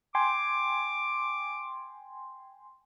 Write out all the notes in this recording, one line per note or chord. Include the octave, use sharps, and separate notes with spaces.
G5 G#5 C6 D6